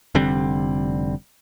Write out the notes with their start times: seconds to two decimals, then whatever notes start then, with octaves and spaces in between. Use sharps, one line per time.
0.15 F1 D3 G3 C4